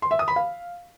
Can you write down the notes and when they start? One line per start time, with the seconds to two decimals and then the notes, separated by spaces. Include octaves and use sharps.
0.02 C6
0.11 E5
0.19 D#6
0.28 B5
0.36 F5